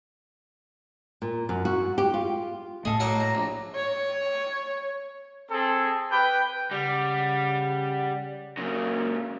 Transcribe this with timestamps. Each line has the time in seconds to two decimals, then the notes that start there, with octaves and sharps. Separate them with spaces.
1.22 A#2
1.49 F#2
1.65 F#4
1.98 G4
2.14 F4
2.85 A2 A3 G#4 A4 D#5
3.00 F#3 A#3 A#4 F5
3.20 A#5
3.35 A#1
3.76 C#5
5.50 C4 G#4 A4
6.12 B4 G5
6.71 C#3 G3 F#5
8.57 A#2 C#3 F#3 G#3 A#3